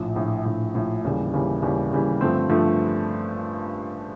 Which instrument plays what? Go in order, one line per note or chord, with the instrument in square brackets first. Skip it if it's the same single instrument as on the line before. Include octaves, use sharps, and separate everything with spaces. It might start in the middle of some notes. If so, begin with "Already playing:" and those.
Already playing: [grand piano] A#1 A2 F3
A#1 A2 F3
A#1 A2 F3
A#1 A2 F3
D#2 C#3 E3 G3
D#2 C#3 E3 G3
D#2 C#3 E3 G3
D#2 C#3 E3 G3
G2 D3 F3 A3 C4
G2 D3 F3 A3 C4